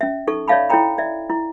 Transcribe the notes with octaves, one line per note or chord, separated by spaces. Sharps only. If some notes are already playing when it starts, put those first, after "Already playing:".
C#4 E5
D#4 A4 C#6
C#5 D5 E5 F5 A5 B5
E4 A4 C#5 G5 A#5 B5
D5 E5
E4